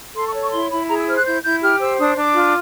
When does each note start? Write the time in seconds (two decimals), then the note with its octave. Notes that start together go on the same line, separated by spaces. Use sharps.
0.16 A4 C6
0.27 C#6
0.34 C#5
0.41 C#6
0.52 E4 C6
0.70 E4 B5
0.88 G#4 A#5
0.98 E6
1.07 C5 F6
1.17 F#6
1.25 E4 G6
1.43 E4 G6
1.62 G4 F6
1.80 C5 E6
1.99 D4 D#6
2.17 D4 D6
2.35 F4